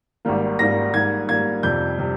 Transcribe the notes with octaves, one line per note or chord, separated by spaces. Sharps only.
G#1 G#2 D#3 G3 A#3
G#1 G#2 D#3 G3 A#3 A#6
G#2 G3 A#3 G#6
G#2 G3 A#3 G#6
F2 C3 G3 G6
C3 G3